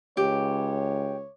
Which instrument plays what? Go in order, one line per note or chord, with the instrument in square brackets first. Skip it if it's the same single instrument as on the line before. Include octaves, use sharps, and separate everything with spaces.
[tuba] C#2 [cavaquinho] G4 [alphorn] C#5